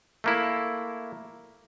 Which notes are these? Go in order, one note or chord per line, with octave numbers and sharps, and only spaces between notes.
A3 A#3 E4